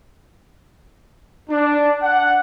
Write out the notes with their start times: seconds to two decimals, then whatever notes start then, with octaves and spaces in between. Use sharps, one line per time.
1.50 D4
2.02 F#5